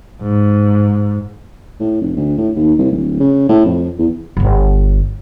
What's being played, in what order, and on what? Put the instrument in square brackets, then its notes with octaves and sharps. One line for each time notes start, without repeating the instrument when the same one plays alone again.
[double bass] G#2
[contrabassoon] A2
F1
D2
A2
D#2
C2
D1
C#3
A2
F2
E2
[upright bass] D1 G1